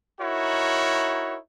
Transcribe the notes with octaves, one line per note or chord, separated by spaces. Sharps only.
D#4 E4 F#4 A#4 C#5